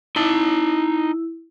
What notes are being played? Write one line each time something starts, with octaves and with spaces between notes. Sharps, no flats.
D#4 E4 A5